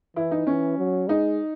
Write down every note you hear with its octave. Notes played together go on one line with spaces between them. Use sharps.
E3 E4
D#4
E3 C#4
F#3
G#3 D#4